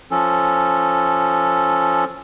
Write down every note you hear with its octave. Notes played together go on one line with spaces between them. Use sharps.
F3 C#4 A4